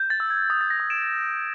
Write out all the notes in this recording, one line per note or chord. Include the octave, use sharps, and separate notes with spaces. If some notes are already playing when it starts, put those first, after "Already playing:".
Already playing: G6
A6
E6
G#6
D#6 A6
A6
A#6
D#6
D7 E7